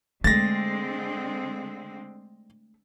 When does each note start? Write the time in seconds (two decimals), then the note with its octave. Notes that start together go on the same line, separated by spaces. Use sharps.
0.24 D3 G#3 A3 C4 A6 A#6